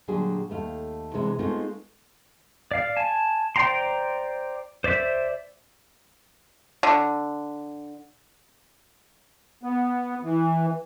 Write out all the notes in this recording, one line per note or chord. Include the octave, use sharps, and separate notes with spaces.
A#2 D3 F#3 G3 D4 G#4
D#2 A3 F5
C3 E3 G#3 D4
G#3 A3 B3 C4 D#4 F4
D5 F5
G#5 A5
C5 D5 G5 A#5 C6
C5 D5 E5
D3
B3
E3